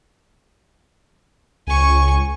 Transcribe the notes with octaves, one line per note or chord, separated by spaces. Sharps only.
C#2 G#5 C#6